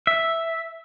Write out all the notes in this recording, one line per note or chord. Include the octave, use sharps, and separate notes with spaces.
E5